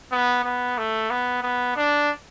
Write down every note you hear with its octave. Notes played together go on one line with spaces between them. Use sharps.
B3
B3
A3
B3
B3
D4